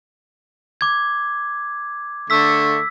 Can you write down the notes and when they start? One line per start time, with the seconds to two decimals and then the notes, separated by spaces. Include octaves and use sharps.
0.81 D6 G#6
2.30 D3 A3 E6 B6